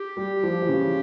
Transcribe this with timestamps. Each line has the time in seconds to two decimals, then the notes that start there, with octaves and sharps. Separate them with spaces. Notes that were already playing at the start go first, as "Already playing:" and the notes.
Already playing: G4
0.17 G3
0.43 F3
0.62 E3
0.69 C#3